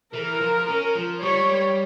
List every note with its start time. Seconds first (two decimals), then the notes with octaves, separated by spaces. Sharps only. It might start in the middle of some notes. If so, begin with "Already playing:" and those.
0.14 E3 A#4
0.41 F3
0.68 C#4
0.95 F3
1.22 G3 C#5